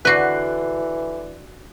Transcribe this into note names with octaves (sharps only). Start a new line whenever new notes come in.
D3 E3 F#4 B4 F#6 C7